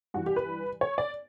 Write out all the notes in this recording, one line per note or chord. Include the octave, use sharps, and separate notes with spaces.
G2 E3 F#4
G4
B4
C#5
D5